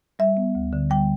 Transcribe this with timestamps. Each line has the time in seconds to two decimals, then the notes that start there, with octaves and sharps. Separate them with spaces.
0.19 G3 E5
0.37 B3
0.55 D2
0.73 D3
0.90 G3 G5